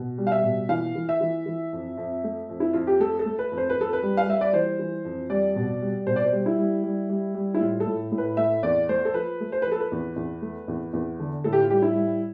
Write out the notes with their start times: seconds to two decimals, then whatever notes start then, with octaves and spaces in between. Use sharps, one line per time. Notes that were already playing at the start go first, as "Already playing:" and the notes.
Already playing: B2
0.18 G3
0.27 F5
0.32 E5
0.44 B2
0.69 E3 F5
0.96 E3
1.09 E5
1.21 E3
1.46 E3
1.73 F2
1.97 F2
2.24 A3
2.49 F2
2.60 E4
2.73 F2 F4
2.87 G4
3.00 A3 A4
3.19 A4
3.26 A3
3.39 B4
3.52 F2
3.57 C5
3.70 B4
3.76 F2 A4
3.93 B4
4.03 G3
4.17 F5
4.27 G3 E5
4.41 D5
4.53 E3 C5
4.79 E3
5.05 F2
5.30 G3 D5
5.56 B2
5.82 G3
6.07 B2 C5
6.16 D5
6.24 C5
6.32 G3
6.46 E4
6.58 G3
6.83 G3
7.09 G3
7.35 G3
7.54 E4
7.60 A2 F4
7.80 A4
7.86 A2
8.12 A2
8.18 B4
8.37 A3 E5
8.63 E2 D5
8.89 A3 C5
9.05 A4
9.14 F3 B4
9.40 A3
9.52 C5
9.62 F3 B4
9.72 A4
9.80 B4
9.92 E2
10.16 E2
10.42 A3
10.68 E2
10.93 E2
11.20 D3
11.44 A2 A4
11.53 G4
11.62 F4
11.70 G3 G4
11.82 E4
11.96 G3